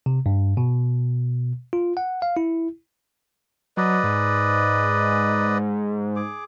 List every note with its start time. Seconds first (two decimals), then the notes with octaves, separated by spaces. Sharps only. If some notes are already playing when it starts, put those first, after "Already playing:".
0.06 C3
0.26 G2
0.57 B2
1.73 F4
1.97 F#5
2.22 F5
2.37 E4
3.77 F#3 B4 D5 D#5
4.04 G#2
6.16 G#4 D6